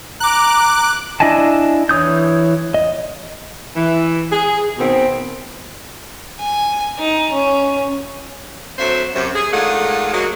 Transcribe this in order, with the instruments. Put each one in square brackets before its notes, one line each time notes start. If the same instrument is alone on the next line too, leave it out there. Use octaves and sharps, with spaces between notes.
[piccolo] A#5 [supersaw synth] D6 F#6
[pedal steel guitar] D4 E4 D#5 G#5 A5
E3 C#5 D#6 G6
D#5
[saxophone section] E3
G#4
B2 D#3 B3 C4
[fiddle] G#5
D#4
C#4
[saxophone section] D2 F#3 C4 C5 E5
F#2 C3
G#4
D#3 G#3 A3 D4 F4 F#5
F#3 G#3 A#3